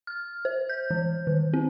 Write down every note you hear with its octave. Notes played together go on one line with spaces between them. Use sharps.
F6
C5
G6
E3
D#3
C4